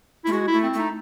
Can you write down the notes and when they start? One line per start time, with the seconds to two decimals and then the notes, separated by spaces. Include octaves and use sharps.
0.25 A3 E4
0.32 G#3 F#4
0.47 E4
0.52 A3
0.64 C4
0.74 A3
0.79 D#4